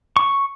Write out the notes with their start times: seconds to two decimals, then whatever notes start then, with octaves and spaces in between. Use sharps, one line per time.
0.17 C#6